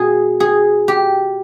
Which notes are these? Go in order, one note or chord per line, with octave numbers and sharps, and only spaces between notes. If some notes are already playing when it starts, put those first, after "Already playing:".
Already playing: B2 G#4
G#4
G4